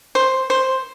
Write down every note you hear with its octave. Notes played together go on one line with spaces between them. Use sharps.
C5
C5